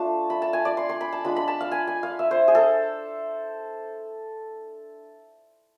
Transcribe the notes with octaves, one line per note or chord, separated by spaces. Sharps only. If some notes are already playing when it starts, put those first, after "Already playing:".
Already playing: A3 D4 F4 A5
B5
A5
G#5
D5
C6
C6
B5
A5
G#3 D4 F4 B5
B5
A5
F5
G#5
G#5
F5
E5
C5
G#4
A4